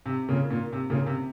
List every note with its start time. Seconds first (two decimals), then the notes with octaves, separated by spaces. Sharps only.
0.06 C3
0.29 A#2 C#3
0.50 A#2
0.73 C3
0.90 A#2 C#3
1.06 C3